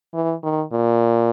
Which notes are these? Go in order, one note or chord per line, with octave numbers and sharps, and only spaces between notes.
E3
D#3
A#2